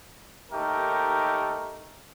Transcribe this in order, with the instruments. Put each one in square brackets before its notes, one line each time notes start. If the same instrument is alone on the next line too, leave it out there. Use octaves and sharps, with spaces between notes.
[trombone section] D#2 A3 D#4 G4 A#4